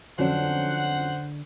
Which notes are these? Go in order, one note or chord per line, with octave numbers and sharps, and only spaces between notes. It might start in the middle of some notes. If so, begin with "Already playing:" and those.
F2 D3 F#3 C#4 D4 C5 F#5